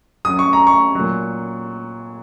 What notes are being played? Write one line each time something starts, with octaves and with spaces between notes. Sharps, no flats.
F#2 F#3 D#6
C#6
A#5
C#6
A#2 F#3